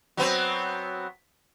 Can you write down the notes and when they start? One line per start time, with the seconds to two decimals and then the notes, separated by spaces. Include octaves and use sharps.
0.17 F#3 B3 C4